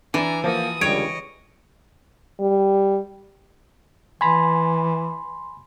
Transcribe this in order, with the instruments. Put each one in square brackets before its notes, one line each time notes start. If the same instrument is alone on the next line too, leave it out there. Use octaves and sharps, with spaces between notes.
[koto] E3 [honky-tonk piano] D4 [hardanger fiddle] G#5 A#5
[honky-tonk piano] F3 A#3 [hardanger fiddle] F#4 D#6
[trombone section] C#2 D3 G3 [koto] C#5 [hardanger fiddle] D#5 [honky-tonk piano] D7
[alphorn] G3
[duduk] E3 [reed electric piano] G#5 B5 [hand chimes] C6